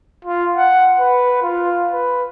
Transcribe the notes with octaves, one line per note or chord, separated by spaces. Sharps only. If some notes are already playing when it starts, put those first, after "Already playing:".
F4
F#5
B4
F4
B4